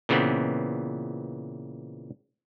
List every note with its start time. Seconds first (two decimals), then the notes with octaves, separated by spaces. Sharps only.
0.09 A#2 C#3 E3 B3 C4